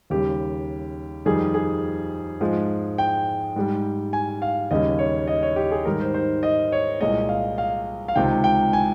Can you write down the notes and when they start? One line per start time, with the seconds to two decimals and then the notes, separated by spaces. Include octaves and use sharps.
0.10 D#2 C#3 G3 G4
1.26 F2 D#3 G3 G#4
1.54 G#4
2.40 G#2 F3 G#3
2.98 G5
3.56 G#2 G3
4.13 G#5
4.42 F5
4.71 D#2 C#3 G3 D#5
4.99 C#5
5.28 D#5
5.43 C#5
5.56 G4
5.71 G#4
5.85 G#2 D#3 G3 A#4
6.00 C5
6.14 C5
6.43 D#5
6.72 C#5
7.01 C2 A#2 G#3 D#5
7.29 F5
7.58 F5
8.08 F5
8.16 C#2 C3 D#3 G5
8.44 G5
8.73 G#5